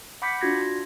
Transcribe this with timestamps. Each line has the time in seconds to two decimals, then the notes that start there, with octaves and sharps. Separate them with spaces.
0.22 F#5 B5 D6 G6 B6 C#7
0.41 D4 F4 F#4 G#6 A#6